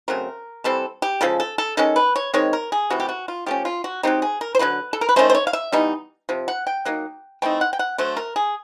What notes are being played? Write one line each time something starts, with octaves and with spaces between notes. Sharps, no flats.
C#3 F#3 A3 C4 A#4
E3 G3 C4 A4
G4
C#3 F3 G#3 A4
A4
A4
D#3 G#3 C#4 A4
B4
C#5
D#3 G#3 C4 C#5
A#4
G#4
C3 E3 A3 F#4
G4
F#4
F4
F3 A3 C#4 G4
F4
F#4
F#3 A3 C4 D#4 G4
G#4
A#4
C5
D3 F#3 A#3 B4
A4
A#4
B4
D#3 F#3 A3 C#4 C5
C5
C#5
F5
E5
E3 G3 B3 D#4
C3 F3
F#5
G5
F#3 A#3 D#4
E3 A3 C4 D#4 G5
F#5
G5
F#5
D3 F#3 A3 C5
A#4
G#4